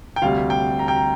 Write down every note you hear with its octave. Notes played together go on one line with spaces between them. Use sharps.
G5
D2 C3 G3 F5
G5
A#5
G5
A#5